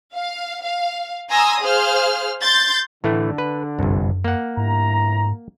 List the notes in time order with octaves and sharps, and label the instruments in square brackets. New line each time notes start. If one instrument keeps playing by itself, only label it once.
[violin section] F5
F5
G#5 A#5 C6 D#6 E6 A#6
G#4 C5 F5 F6
C6 G6 A6
[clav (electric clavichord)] A2 E3 A3 [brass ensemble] D3
[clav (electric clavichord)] B4
[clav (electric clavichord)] G1 C2 [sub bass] F#2
[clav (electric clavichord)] A#3 F#5
[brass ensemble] G1 E4 A#5 [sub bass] G#2